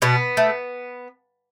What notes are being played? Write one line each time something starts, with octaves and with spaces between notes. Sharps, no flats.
B2 B3
A3